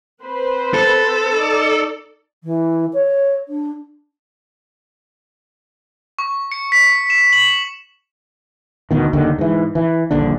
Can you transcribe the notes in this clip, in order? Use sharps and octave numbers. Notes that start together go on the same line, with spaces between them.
C4 B4 C5
A4
D#4 D5
E3
C#5
D4
C#6
C#7
B6
E7
F#7
D2 B2 D#3
F#1 D#2 D3 D#3
G#2 E3
E3
D#1 A#1 D3 D4